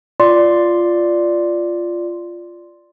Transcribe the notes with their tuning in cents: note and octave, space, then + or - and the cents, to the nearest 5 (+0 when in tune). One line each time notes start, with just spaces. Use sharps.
F4 -5 D5 +0 C6 +0